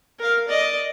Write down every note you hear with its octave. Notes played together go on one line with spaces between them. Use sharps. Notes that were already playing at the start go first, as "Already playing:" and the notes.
A#4 F5
D5 D#5